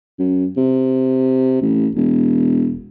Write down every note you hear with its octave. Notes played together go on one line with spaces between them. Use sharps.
F#2
C3
A1
E1